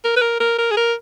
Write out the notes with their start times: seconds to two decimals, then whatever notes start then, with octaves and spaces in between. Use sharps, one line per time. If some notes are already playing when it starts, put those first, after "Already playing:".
0.04 A#4
0.17 B4
0.22 A#4
0.40 A#4
0.59 A#4
0.71 G#4
0.77 A#4